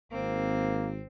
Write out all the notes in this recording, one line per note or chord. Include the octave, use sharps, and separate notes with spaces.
G#1 A#3 C4